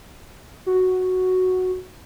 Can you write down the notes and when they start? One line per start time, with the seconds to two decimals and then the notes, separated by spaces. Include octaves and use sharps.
0.66 F#4